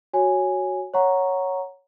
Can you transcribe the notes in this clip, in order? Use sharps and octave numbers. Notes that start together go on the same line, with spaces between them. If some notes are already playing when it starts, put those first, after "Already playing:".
F#4 C#5 G#5
C#5 F#5 A#5 C#6